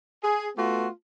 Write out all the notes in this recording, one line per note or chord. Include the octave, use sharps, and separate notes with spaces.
G#4
A3 B3 F4 F#4